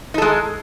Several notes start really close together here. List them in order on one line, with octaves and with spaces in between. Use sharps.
D#4 A4 G#3